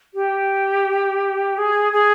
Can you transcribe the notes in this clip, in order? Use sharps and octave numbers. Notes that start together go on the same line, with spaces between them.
G4
G#4
G#4